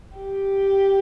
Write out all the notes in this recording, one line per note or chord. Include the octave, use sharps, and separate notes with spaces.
G4